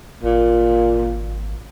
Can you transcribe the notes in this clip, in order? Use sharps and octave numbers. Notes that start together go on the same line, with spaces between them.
G#1 A#2